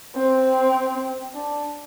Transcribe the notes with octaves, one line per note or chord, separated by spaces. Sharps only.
C4
D4